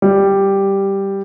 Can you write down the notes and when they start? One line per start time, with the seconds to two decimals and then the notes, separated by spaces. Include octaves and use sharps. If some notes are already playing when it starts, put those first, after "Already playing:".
0.02 G3